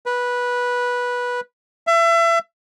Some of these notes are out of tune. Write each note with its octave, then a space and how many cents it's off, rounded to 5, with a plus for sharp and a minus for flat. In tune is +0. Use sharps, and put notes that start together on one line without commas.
B4 -15
E5 +30